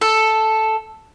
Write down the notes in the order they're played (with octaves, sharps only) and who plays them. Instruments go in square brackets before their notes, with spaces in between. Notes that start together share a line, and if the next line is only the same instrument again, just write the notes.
[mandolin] A4